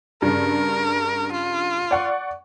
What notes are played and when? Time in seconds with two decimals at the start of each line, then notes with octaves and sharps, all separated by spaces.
0.22 G2 C#3 A#4
1.32 F4
1.91 D5 F#5 C#6